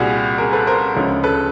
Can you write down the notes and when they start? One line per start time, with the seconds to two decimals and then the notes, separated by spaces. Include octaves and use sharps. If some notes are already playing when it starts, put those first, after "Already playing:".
Already playing: C2 A#2 G3 F#4 G#4
0.38 G#4 A#4
0.53 A4 B4
0.67 A#4 C5
0.95 D2 C#3 F3 G#3
1.23 A4 B4